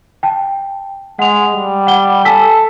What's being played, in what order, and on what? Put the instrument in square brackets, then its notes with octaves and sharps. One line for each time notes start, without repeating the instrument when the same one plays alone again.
[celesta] G5 A5
[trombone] G#3 [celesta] F#5 F7
[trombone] G3
[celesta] F#5 G7
[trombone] A4 [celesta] G#5 E6 B6